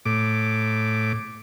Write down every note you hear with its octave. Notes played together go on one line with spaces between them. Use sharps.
A2 D6